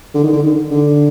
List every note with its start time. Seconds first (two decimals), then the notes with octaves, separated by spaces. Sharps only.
0.15 D3
0.23 D#3
0.32 D3
0.43 D#3
0.71 D3